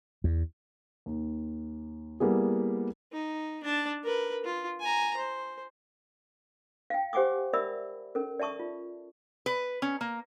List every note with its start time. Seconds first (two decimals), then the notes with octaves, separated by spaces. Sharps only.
0.24 E2
1.06 D#2
2.20 G3 A#3 B3 E4 G#4
3.13 D#4
3.63 D4 A5
4.03 A#4 B4
4.45 F4
4.80 G#5 A#5
5.17 C5
6.90 F5 G5
7.13 G4 C5 F#5 G#5 D6 D#6
7.53 A#4 D5 E5 B5 D#6 E6
8.15 C#4 A4 A#4
8.39 D5 E5 A5 C#6 D#6
8.60 F4
9.46 B4
9.82 C#4
10.01 A#3